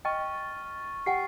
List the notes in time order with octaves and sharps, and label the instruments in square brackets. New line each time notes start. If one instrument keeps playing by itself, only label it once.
[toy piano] D#5 G5 [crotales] C#6 F6 A6
[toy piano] G4 F#5 G5 [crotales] C7